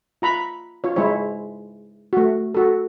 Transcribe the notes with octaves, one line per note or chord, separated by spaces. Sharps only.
F4 A#5 B5
F4 C#5
G#3 E4 C5 C#5
A3 F#4
F#4 A4